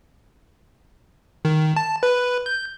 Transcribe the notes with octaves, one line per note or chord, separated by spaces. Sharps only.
D#3
A5
B4
G6